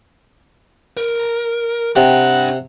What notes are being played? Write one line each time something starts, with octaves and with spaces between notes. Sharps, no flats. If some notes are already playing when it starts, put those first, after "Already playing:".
A#4
C3 D4 F#5 G5